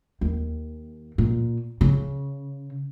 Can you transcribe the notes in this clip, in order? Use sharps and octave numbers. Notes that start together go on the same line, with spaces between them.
D#2
A#2
C#3